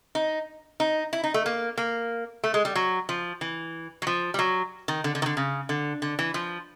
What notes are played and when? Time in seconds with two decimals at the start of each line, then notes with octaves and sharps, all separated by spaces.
0.15 D#4
0.80 D#4
1.13 E4
1.24 D#4
1.34 A3
1.46 A#3
1.78 A#3
2.44 A3
2.54 G#3
2.65 G3
2.75 F#3
3.09 F3
3.41 E3
4.02 F#3
4.07 F3
4.34 G3
4.39 F#3
4.88 D#3
5.04 D3
5.15 D3
5.22 D#3
5.26 D3
5.37 C#3
5.69 D3
6.02 D3
6.19 E3
6.34 F3